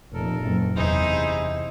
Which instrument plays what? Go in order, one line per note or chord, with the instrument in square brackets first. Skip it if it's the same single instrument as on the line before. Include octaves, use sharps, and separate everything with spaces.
[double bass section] F1 A#2 [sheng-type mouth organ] A4 A#4
[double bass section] F#1
[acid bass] E2 [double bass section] C3 [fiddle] D#4 [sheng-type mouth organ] E4 G#4 C5